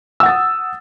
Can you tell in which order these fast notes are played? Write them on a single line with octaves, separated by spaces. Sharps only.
E6 F#5 A6 D#6